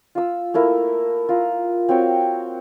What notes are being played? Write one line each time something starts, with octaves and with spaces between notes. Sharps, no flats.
F4 E6
A3 A#3 E4 A#4
F4 A#5
C4 F#4 C#5 G5